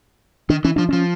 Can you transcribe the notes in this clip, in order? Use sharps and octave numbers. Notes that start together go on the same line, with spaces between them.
D#3 D4
E3 C#4
F3 D4
F3 C#4